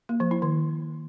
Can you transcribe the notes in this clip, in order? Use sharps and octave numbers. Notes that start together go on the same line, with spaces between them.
A#3
F3
E4
D#3